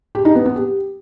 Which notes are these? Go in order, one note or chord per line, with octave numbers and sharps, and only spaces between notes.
G4
D#4
B3
B3
G4